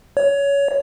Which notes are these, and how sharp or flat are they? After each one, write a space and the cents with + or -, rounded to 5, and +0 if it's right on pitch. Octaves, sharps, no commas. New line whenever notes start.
C#5 +20